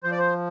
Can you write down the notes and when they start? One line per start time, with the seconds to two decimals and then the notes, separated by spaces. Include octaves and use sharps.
0.03 F3 C5
0.12 D5
0.18 C5